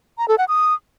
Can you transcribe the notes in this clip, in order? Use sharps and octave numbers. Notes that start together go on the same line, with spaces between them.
A#5
A4
F#5
D#6